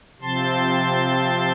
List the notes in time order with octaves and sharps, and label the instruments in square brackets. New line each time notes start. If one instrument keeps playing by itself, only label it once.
[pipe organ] C3 F3 C4 A5 C6